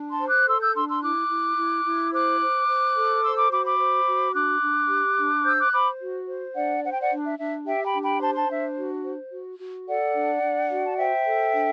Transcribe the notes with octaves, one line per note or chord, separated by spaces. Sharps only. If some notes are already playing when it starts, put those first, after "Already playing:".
Already playing: D4
A5 C6
C5
D6 F#6
A4 C6 E6
E6 G6
D4 C6 E6
C6 E6
E4 D6 F#6
E4
E4
E4
C5 D6 F#6
C5
C5
A4
C5 C6 E6
B5 D6
F#4 B5 D6
B5 D6
C5
F#4
D4 D6 F#6
D4
G4
D4
C5 E6 G6
D6 F#6
C5 B5 D6
F#4
C5
D4 D5 F#5
C5 F#5
G5
D5 F#5
D4
E5
D4 E5
G4 E5 G5
G5 B5
D4
G5 B5
C5 A5 C6
A5 C6
D4 E5
F#4
C5
F#4
F#4
A4 D5 F#5
D4
D4
F#4
A5
C5 E5 G5
A4
D4